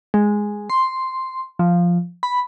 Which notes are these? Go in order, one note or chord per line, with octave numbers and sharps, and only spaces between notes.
G#3
C6
F3
B5